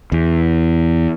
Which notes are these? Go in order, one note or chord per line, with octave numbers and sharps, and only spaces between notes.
E2